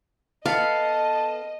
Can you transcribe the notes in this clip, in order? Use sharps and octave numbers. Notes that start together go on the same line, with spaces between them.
B3 A4 D#5 F5 A5